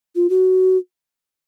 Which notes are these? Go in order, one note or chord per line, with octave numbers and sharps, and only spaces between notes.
F4
F#4